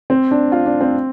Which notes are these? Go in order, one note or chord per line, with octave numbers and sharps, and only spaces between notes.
C4
D4
F4
D4
C4